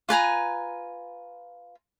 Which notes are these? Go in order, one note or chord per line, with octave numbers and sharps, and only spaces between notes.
F4 B4 G#5 A#5